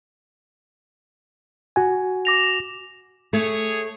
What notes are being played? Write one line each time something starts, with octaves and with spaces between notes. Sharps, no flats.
F#4 G#5
D6 A#6 F7
A3 G#4 C#5